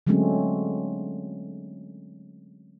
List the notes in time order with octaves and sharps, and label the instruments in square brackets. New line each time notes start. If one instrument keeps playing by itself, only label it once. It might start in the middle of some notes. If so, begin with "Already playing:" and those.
[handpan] D3 F#3 G#3 A3 C4 C#4